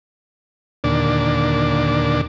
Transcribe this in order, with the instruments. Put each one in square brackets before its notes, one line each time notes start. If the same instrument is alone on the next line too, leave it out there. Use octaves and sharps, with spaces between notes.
[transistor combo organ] D#2 A#2 D3 D4